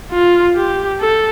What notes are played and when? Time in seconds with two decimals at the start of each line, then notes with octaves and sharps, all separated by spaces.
0.11 F4
0.56 G4
1.01 A4